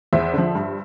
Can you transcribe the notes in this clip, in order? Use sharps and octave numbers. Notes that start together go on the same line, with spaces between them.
E2 C5 E5
D3 F3
G2